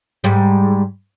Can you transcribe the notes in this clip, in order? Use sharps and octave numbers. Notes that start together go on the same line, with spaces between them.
G#2 G3